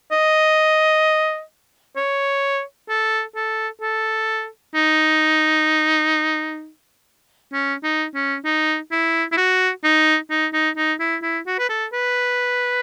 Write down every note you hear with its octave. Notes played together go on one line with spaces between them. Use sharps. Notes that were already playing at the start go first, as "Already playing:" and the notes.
D#5
C#5
A4
A4
A4
D#4
C#4
D#4
C#4
D#4
E4
E4
F#4
D#4
D#4
D#4
D#4
E4
E4
F#4
B4
A4
B4